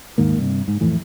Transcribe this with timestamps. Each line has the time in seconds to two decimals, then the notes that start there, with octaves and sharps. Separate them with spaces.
0.18 D#2 G#2 D#3 A#3
0.38 G2 C3
0.68 G#2
0.81 F2 A2 E3 A3